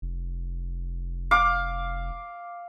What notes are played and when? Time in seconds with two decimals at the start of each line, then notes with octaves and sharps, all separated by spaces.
0.02 F1
1.31 F5 D6